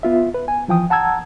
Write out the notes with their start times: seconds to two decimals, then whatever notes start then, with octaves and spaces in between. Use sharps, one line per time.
0.03 B3 F4 E5
0.34 B4
0.48 G#5
0.68 E3 F3 G5 D#6
0.90 F#5 A5 A#5 E6 G#6